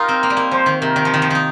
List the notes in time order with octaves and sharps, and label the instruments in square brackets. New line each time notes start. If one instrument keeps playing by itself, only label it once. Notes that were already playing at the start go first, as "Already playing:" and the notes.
Already playing: [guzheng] D#4 F4 G4 [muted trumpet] A#4
[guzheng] C4
A#3
G3
A#3
[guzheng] F3 [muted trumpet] C5
[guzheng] D#3
[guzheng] C3 [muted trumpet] A#4
[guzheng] D#3
F3
D#3
F3
D#3 D#4